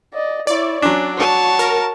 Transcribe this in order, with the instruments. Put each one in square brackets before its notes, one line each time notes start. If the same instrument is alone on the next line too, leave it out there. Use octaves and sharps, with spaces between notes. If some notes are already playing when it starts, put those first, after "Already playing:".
[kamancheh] D5 D#5
[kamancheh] E4 C#5 [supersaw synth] D5
[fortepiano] F#3 D4 [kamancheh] C#4
[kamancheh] F#4 [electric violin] C#5 A5
[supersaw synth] A#4